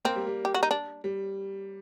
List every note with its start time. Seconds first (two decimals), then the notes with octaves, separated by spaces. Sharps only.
0.05 A#3 C4
0.16 G3
0.27 G3
0.45 G4
0.54 F#4
0.63 D#4
0.71 D4
1.04 G3